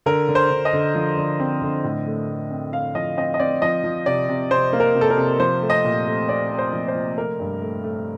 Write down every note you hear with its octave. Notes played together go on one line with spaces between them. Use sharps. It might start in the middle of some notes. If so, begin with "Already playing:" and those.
D3 A#4
D3
C5
D3
D#5
D3
F3
D3
C4
D3
A2
A3
A3
C4
C4 F5
F3 D#5
C4 D#5
D#5
C4 D5
F3 D#5
F3
C3 D5
C3
C3 C5
A#3
A#4
C3
A4
A#4
C3
F3 C5
A3
D#5
A#2
A3
C4 D5
C4
C5
F3
C5
F3
A3 A#4
G2
A3
A3